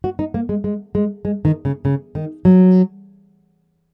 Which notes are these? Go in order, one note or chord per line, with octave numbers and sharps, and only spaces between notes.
F#4
D#4
A#3
G#3
G#3
G#3
G#3
D#3
C#3
C#3
D#3
F#3